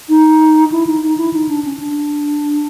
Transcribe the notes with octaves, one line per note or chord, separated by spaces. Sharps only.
D#4
E4
D#4
D#4
E4
D#4
D4
C#4
D4